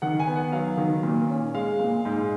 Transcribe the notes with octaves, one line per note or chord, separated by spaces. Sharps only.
D#3 F#5
G#5
B3
F#5
F#3 F5
D#3
A#2
C#4
G#3 F5
A#2
G#2